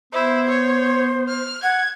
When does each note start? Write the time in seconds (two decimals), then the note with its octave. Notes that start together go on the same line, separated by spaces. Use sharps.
0.13 B3 E4 C5
0.50 C#5
1.28 F6
1.63 F#5 G#6